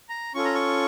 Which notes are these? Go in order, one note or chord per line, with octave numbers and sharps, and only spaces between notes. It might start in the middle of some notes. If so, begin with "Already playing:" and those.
A#5
C#4 F4 A4 C#6
A#5
C#6